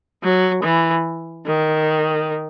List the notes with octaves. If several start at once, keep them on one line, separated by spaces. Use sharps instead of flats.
F#3
E3
D#3